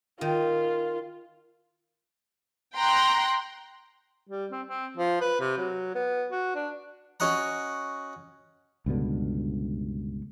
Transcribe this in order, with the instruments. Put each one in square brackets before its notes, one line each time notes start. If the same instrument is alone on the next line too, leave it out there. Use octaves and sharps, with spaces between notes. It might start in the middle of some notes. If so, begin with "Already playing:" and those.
[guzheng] D#3 [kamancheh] F4
[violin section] G5 A#5 C6 F#6
[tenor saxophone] G3
C4
C4
F3
B4
C3
F#3
B3
F#4
D4
[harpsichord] C#4 F#4 D#5 F#5 A#5
[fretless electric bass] C#2 G2 B2 D3